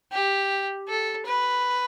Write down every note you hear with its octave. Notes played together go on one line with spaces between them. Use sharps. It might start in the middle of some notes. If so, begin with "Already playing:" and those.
G4
A4
B4